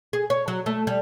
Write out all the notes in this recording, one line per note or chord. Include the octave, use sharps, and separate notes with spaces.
G#4
C#5
F#3
A3
G3